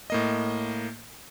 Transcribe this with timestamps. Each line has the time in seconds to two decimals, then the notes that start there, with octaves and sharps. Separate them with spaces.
0.10 A2 A#3 D#5